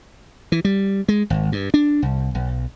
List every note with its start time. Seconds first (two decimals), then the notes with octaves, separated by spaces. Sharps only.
0.52 E3
0.65 G3
1.09 G#3
1.30 G#1
1.52 G2
1.74 D4
2.02 C2
2.35 B1